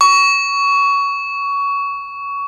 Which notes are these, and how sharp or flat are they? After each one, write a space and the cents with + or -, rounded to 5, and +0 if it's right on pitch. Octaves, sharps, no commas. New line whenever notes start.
C#6 +20